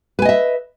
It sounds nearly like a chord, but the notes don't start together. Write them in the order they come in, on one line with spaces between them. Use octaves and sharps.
B4 G#5 D#5 E5